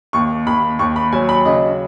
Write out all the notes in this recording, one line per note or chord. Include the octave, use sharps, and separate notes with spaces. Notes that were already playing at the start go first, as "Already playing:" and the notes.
D#2 C#6
D#2 B5
D#2 C#6
B5
F#3 G#5
B5
C#3 D#5